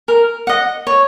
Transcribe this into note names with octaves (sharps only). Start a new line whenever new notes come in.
A#4
D#5 F#5
C#5